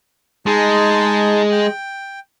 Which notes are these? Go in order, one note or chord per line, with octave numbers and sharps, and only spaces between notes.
G#3 D#4 G#4 A5
G5